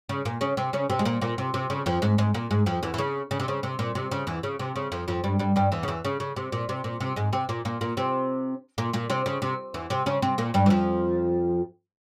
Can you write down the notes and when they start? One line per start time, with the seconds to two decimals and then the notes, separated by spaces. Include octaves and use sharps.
0.09 C#3
0.25 A#2 A#3
0.41 C#3 C#4
0.57 C3 C4
0.73 C#3 C#4
0.90 C3 C4
0.99 G#3
1.05 A#2 A#3
1.21 A#2 A#3
1.38 C3
1.54 C3
1.70 C#3
1.86 F2 F3
2.02 G#2 G#3
2.18 G#2 G#3
2.34 A#2 A#3
2.51 G#2 G#3
2.66 F2 F3
2.83 E2 E3
2.94 E3
2.98 C#3
3.31 C#3
3.40 C3
3.48 C#3
3.63 C3
3.79 A#2
3.95 C3
4.11 C#3
4.27 E2 E3
4.43 C#3
4.59 C3
4.76 C#3
4.92 F2 F3
5.08 F2 F3
5.24 G2 G3
5.39 G2 G3
5.56 G2 G3
5.72 E2 E3
5.83 C#3
5.88 E2 E3
6.05 C#3
6.20 C#3
6.36 C3
6.52 A#2
6.69 C3
6.84 A#2
7.00 C3
7.16 G#2 G#3
7.33 C3 C4
7.49 A#2 A#3
7.65 A#2 A#3
7.81 A#2 A#3
7.97 C3 C4
8.78 A#2 A#3
8.93 A#2 A#3
9.10 C3 C4
9.26 C#3
9.42 C3
9.74 E2 E3
9.90 C3 C4
10.06 C#3 C#4
10.22 C3 C4
10.38 A#2 A#3
10.54 G2 G3
10.66 E3
10.70 F2 F3